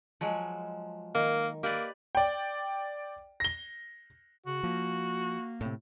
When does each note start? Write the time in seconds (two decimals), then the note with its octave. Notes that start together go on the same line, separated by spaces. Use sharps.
0.21 F3 F#3 G#3
1.15 D#3 A#3
1.63 A#3 G4 B4 D5
2.15 D5 G5
3.40 A#6 G7
4.46 C#3 F#4
4.63 F3 A#3
5.61 A2 C3